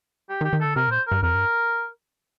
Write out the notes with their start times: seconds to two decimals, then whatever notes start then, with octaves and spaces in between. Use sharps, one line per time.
0.29 G4
0.41 D#3
0.45 G4
0.53 D#3
0.60 D3 A4
0.76 C3 A#4
0.88 A#2 C5
1.07 G2 A#4
1.23 F2 A#4
1.35 G2